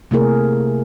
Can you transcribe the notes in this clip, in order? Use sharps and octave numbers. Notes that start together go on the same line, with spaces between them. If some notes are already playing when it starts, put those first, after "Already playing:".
C3 A3 A#3 E4 G#4 A#4